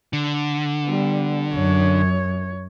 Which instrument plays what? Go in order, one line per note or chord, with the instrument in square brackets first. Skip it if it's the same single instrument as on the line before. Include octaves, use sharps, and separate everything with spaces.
[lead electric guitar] D3
[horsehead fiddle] G3 B3
[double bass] F#2 [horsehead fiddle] C#5